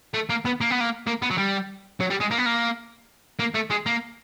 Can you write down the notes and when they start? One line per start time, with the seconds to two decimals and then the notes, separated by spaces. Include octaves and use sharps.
0.14 A3
0.29 A#3
0.45 B3
0.61 A#3
0.71 B3
0.81 A#3
1.07 A#3
1.22 B3
1.31 F#3
1.38 G3
2.00 F#3
2.10 G3
2.21 G#3
2.31 A#3
2.38 B3
2.46 A#3
3.39 A#3
3.55 A3
3.70 G#3
3.86 A#3